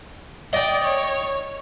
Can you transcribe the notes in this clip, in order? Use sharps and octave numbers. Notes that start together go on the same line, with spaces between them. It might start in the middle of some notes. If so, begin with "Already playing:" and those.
D5 D#5 G5
C#5